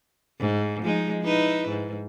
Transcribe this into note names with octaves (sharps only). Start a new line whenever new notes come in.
G#2
F3 G#3 D#4
D#4 E4 B4
G#2